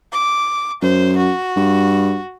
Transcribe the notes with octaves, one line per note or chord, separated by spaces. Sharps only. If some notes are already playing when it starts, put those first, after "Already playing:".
D6
F#2 C5
F#4
G2